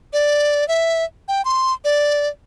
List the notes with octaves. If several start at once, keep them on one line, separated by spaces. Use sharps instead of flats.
D5
E5
G5
C6
D5